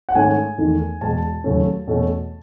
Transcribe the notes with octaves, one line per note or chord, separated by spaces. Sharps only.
F#5
G#2 D#3 A3 C#4 G#5
E2 D#3 A3
E2 B2 G#3 A5
D#2 C#3 F#3 A3 C#4
E2 B2 A3 C#4